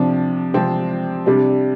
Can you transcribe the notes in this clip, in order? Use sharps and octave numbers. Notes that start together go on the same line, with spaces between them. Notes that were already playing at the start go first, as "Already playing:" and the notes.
Already playing: C3 F3 D4
C3 F3 C4
C3 G3 D4